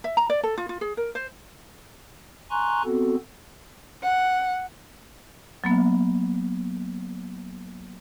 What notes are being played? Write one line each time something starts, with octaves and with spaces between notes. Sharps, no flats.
E5
A#5
D5
A4
F4
F4
G#4
A#4
C5
G#5 A#5 C6 C#6 F#6
B3 C4 F#4 A4
F#5
F#3 A#3 B3